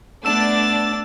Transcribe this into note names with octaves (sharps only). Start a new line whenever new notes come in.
A3 B3 D4 E6 A6 E7